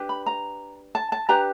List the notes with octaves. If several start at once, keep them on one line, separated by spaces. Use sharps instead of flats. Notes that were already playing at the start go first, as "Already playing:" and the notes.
Already playing: D4 G4 B4
B5
A#5
A5
A5
D4 G4 B4 A#5